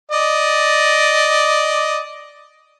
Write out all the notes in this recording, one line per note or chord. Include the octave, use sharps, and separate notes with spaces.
D5 D#5